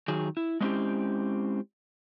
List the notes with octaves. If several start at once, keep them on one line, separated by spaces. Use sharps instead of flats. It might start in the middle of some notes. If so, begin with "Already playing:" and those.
D#3 F#3 G#4
E4
G#3 A3 C4 C#4 E4 G4